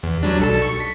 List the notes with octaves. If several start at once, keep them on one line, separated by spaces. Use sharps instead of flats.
E2
F#3 G3 D4
B1 A4 A5
C#6
B6